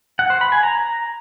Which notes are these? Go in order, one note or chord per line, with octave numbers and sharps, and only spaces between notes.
F#5
C5
B5
G#5
A#5